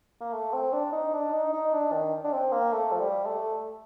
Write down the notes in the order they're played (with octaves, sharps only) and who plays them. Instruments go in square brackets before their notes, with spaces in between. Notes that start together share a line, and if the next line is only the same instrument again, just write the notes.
[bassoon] A#3
A3
C4
D4
D#4
D4
D#4
D#4
D4
D#3
D4
C4
A#3
A3
F3
G3
A3